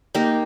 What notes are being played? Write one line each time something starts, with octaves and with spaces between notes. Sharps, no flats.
A#3 D#4 G4